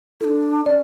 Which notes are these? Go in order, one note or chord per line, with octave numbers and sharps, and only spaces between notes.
D4 E4 A4
C#4 D5